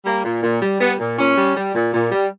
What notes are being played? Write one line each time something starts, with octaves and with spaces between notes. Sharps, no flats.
G3 A#3
A#2
A#2
G3
G3 B3
A#2
A#2 C#4
G3
G3
A#2
A#2
G3